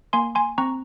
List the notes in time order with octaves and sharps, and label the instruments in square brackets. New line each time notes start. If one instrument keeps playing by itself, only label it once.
[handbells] A#3 G#5 C6
G#5 C6
C4 A#5 C#6